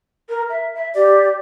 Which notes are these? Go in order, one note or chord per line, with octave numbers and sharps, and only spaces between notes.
A#4
E5
E5
G4 D5